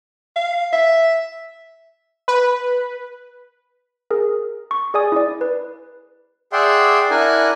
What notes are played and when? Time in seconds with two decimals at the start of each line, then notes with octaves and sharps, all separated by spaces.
0.36 F5
0.73 E5
2.28 B4
4.11 G#4 A#4
4.71 C#6
4.94 G#4 D5 G#5 D#6
5.12 E4 D5
5.41 B4
6.53 G#4 D5 E5 F#5 G5 C6
7.10 D4 E4 A#4 F#5 G#5